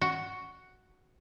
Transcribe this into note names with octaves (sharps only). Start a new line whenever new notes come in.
F#4